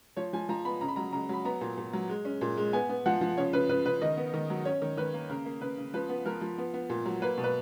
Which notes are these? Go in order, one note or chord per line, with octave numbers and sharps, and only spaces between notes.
F3 C#5
F3 G#5
F3 A#5
B3 B5
C#3 A#5
B5
F#3 A#5
C#3 A#5
F#3 B5
B3 A#5
A#2
A#2
F#3
G#3
C#4
A#2
G#3
B3 G#5
B3
F3 F#5
F3
C#3 C#5
C#3 B4
C#3 B4
C#3 B4
D#3 D#5
B3
D#3
F#3
C#4 C#5
D#3
D#3 B4
A#3
C#3 A#4
A#3
C#3 B4
C#3
F3 B4
B3
F3 A#4
F3
B3
B3
A#2
F#3
A#3 B4
B2
B4